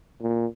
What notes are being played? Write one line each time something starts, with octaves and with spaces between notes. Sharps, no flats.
A#2